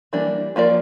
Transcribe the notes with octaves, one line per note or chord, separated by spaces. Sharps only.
E3 G3 A#3 D4
F3 A#3 F4 A#4 D5